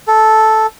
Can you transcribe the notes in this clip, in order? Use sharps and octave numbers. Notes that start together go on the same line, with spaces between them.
A4